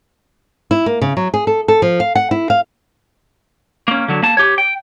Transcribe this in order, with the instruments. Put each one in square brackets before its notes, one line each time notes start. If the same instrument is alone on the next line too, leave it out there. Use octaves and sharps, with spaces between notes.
[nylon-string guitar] E4
A#3
C#3
F#3
G#4
A4
A4
F3
F5
F#5
E4
F5
[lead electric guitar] A#3 C#4
D3 F#3
A#3 A5
G4 C#5
G5